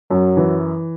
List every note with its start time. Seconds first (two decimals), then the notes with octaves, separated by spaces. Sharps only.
0.11 F#2 F#3
0.37 E3